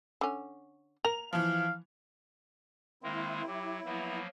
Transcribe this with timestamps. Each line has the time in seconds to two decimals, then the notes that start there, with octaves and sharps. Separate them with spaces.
0.21 D3 C#4
1.05 A#4 F7
1.33 E3 F3 F5
3.03 D#3 G#3 A#3 C4 E4
3.47 F#3 G4
3.85 F3 F#3 A#3 B3